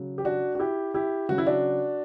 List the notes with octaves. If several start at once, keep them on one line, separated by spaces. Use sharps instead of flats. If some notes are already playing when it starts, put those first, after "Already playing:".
Already playing: C#3 F#3
G4
D4 F#4
F#4
E4 G4
E4 G4
C#3 F#3 F#4
E4
D4 F#4